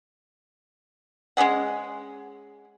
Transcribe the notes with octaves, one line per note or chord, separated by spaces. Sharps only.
G#3 C#4 G#4 F#5